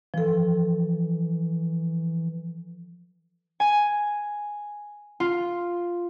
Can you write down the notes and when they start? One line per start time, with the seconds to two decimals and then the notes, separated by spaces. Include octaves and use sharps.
0.14 E3 F3 A4
3.60 G#5
5.20 F4